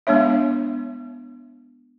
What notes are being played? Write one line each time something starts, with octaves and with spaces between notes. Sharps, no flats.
G#3 B3 D4 C#5 E5